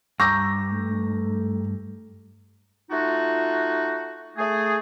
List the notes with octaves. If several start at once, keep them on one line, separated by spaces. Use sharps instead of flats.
G2 A#5 C#6 D6 E6 G6 A#6
A3
A3 D#4 F4 F#4
A3 G#4